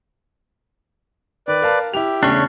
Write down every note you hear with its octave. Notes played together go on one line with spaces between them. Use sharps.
D#3 B4 D5
A#4 F5 A5
E4 G4 F7
E2 C#3 A3 C#4 D4